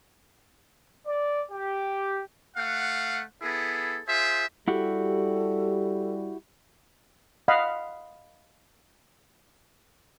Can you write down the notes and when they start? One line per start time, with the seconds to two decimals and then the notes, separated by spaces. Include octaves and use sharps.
1.05 D5
1.50 G4
2.56 A3 F5 F#5
3.42 B3 E4 G#4 A4
4.07 F4 G#4 C5 E5
4.68 G3 E4 F#4 G4 A4
7.48 D#5 F5 F#5 B5